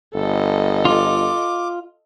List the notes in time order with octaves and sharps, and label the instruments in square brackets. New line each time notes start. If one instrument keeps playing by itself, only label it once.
[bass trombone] G1 [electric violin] A4 D#5
[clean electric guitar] F4 [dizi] D6